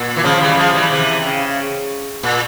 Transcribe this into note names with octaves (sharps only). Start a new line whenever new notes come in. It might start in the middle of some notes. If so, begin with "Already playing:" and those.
Already playing: A#2
E3
C#3 F3
E3 G3
F3 G#3
E3 G3
C3 E3
C#3
A#2